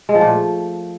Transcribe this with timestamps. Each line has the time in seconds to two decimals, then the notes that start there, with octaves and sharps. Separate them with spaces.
0.09 G#3
0.15 F3
0.21 A#2
0.27 A3